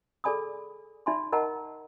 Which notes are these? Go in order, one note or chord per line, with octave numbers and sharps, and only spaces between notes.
G#4 A4 D5 G#5 B5 D#6
D#4 D5 E5 G#5 B5 C6
A#4 D#5 F#5 A5 A#5